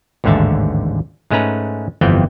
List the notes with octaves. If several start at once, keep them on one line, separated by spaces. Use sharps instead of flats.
A1 D#2 G#2 D3 E5 A5
G#2 G#3 A3 C#4 B4 A#5
G1 F2 E3 B3 C4 G5